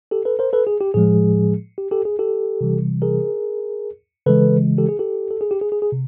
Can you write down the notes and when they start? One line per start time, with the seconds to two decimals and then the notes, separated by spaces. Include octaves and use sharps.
0.11 G4 A4
0.25 A4 B4
0.39 A#4 C5
0.53 A4 B4
0.67 G#4
0.81 G4
0.94 A2 F3 G#3 G#4
1.78 G4
1.91 G4 A4
2.05 G#4
2.19 G4 A4
2.61 C3 E3 G3
3.02 G#4 A#4
4.26 C#3 E3 G#3 A4 B4
4.78 G4 A4
4.89 G#4
4.99 G4 A4
5.31 A4
5.41 G#4
5.51 G4
5.61 G#4
5.72 G#4
5.82 G#4
5.92 C3